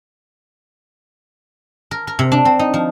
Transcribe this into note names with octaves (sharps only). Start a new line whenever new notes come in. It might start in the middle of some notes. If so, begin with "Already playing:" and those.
A#4
A#4
C3
D4
C4
D#4
F3